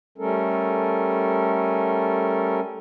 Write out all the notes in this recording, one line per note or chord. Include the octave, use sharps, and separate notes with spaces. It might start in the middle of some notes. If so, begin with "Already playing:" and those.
G3 A3 C#4 A4 A#4